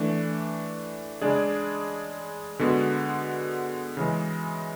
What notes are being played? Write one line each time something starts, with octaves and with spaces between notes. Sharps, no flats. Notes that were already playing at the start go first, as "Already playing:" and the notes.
Already playing: E3 A3 D4
C#3 G#3 D4 G#4 D5
D3 G#3 B3 F#4
C#3 E3 G#3